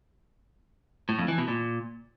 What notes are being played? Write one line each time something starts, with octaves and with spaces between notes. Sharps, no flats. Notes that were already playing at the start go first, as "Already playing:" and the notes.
A2
F2
E3
B2
A#2